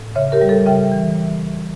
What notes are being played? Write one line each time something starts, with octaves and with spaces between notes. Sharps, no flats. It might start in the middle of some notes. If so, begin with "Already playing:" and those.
Already playing: A2
C#3 C#5 E5
G4 A#4
G3
A4
C#3 E5 G5
E3